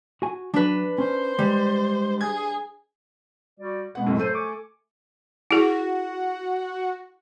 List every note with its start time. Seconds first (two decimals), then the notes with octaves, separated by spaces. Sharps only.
0.22 F#4 G#5
0.54 F#3 D4 B4
0.98 C#4 C5
1.39 G3 G#3
2.21 G#4 G#5 G#6
3.59 G3 F#4 D5
3.95 B2 G#3 B3 F#5
4.07 F#2 A2 C3
4.18 F#3 A3 A4 C5 D#7
4.33 G#5 C#6 D6
5.51 E4 F#4 G#4